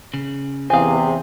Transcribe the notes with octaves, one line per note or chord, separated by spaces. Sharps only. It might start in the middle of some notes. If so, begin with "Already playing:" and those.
C#3
E2 C3 C4 G#4 F5 G#5